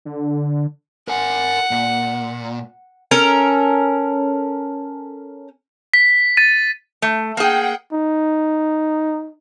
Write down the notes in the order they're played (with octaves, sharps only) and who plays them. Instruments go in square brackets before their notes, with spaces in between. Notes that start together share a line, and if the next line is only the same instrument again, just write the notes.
[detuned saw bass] D3
[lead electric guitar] A#4 G#5 [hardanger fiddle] F#5
[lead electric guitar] A#2
[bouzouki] C#4 A4 A#4
[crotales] B6
A6 D#7
[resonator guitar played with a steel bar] A3
[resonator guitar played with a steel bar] A#3 G#4 [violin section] F#5 G5
[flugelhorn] D#4